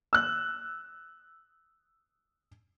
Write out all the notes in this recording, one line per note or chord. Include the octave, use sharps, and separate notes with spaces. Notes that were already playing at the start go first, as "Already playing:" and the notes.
E6 F#6